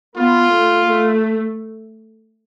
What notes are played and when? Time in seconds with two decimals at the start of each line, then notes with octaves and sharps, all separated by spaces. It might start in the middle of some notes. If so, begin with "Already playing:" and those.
0.16 B3 F4
0.51 A3
0.86 A3